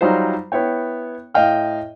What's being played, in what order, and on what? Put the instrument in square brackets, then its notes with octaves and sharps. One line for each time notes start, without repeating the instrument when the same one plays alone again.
[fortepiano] F#3 G3 D#4 F4 C5
B3 E4 C#5 G5
A2 D#5 F5 G5 F6